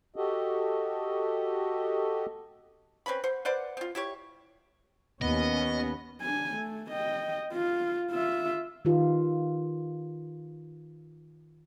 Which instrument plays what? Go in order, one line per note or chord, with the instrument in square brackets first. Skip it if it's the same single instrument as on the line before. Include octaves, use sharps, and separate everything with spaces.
[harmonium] F#4 G4 A4 D#5
[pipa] C4 C#4 B4 B5
C5 F#5
B4 C5 D5 F#5
C4 F4
E4 G4 C#5
[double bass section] D#2 C#4 [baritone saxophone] B3 [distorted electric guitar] D#5
[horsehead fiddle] D4 G#5
A3
D#5 G5
F4
F4 E5
[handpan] D#3 D#4 F4 G4 B4